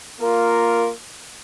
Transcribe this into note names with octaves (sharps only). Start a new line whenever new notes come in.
A#3 F4 A#4